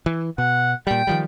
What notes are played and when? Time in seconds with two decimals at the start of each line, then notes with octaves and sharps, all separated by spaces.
0.06 E3
0.38 B2 F#5
0.87 A#2 G3 G5
1.07 D#3 F3 G3